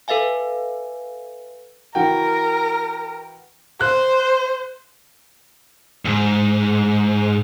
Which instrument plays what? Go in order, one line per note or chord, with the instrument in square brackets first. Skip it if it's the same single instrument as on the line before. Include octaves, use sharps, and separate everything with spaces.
[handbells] A4 B4 E5 F5 G#5
[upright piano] E3 F#4 G5 [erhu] A#4
[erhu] C5 [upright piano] F#6
[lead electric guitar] D2 G#2